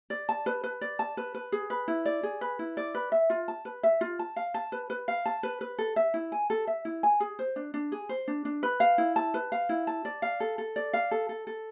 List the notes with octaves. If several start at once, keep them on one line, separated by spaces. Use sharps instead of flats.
D5
A5
B4
B4
D5
A5
B4
B4
G#4
B4
E4
D5
G#4
B4
E4
D5
B4
E5
F4
A5
B4
E5
F4
A5
F5
A5
B4
B4
F5
A5
B4
B4
A4
E5
E4
G#5
A4
E5
E4
G#5
G#4
C5
D4
D4
G#4
C5
D4
D4
B4
F5
E4
A5
B4
F5
E4
A5
D5
F5
A4
A4
D5
F5
A4
A4
A4